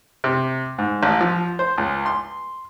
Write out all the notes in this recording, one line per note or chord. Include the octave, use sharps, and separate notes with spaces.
C3
G#2
A1
F3
C5
C#2
C6